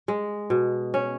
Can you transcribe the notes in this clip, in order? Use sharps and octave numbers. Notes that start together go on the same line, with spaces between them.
G#3
B2
C#4